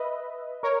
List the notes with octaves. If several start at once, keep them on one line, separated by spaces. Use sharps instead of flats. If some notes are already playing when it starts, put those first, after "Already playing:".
Already playing: B4 D#5 E5
A#4 C#5